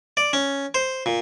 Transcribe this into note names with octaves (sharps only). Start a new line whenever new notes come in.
D5
C#4
C5
A#2